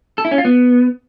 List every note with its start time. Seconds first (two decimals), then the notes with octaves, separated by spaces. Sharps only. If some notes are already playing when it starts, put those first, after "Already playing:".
0.18 A4
0.25 E4
0.31 C#4
0.38 F4
0.45 B3